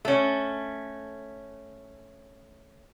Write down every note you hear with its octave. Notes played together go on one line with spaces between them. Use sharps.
A3 C#4